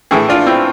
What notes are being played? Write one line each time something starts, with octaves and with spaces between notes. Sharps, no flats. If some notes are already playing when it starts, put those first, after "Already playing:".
A2 E3 E4 G#4
D4 F4
C4 E4